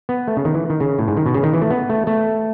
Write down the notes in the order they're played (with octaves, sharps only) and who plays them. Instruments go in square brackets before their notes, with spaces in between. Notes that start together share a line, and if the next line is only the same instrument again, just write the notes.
[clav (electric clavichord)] B3
A3
C#3
D#3
E3
D#3
C#3
A2
G#2
D#3
B2
C#3
D#3
E3
A3
B3
A3
A3